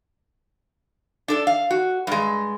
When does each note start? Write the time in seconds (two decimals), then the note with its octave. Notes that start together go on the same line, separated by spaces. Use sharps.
1.28 D4 A4 D5
1.47 F5
1.71 F#4
2.07 G2 G#3